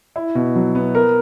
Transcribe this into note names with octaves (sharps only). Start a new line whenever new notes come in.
E4
B2
F#3
B3
A#4